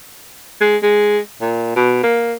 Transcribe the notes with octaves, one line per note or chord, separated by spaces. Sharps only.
G#3
G#3
A#2
B2
A#3